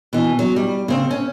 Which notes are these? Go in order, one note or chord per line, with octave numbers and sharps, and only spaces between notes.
B2 E3
F#3
G3
C#3 C4
C#4